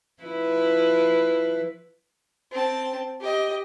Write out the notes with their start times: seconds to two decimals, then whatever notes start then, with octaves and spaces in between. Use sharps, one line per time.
0.23 F3 E4 B4
2.51 C4 A5
3.20 G4 D#5